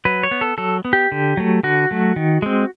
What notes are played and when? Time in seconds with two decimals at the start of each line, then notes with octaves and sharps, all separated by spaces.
0.05 F#3 B4
0.23 C#5
0.31 B3
0.41 A4
0.58 F#3 A4
0.85 B3
0.93 G4
1.12 D3
1.37 F#3 A3
1.63 D3 F#4
1.91 F#3 A3
2.16 D#3
2.42 G#3 C4